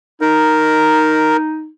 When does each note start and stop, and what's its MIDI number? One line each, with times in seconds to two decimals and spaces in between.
0.21 1.69 63
0.21 1.37 70